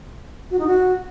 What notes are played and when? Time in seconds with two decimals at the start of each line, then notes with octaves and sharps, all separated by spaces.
0.51 F#4
0.59 D#4
0.67 F#4